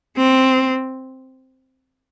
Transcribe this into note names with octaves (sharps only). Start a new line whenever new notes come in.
C4